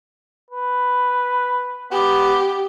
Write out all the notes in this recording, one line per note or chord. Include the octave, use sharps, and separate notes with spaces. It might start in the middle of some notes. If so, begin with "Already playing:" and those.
B4
B3 G4